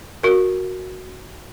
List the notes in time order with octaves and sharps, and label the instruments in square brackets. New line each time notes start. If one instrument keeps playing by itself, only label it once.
[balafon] F#4 A#4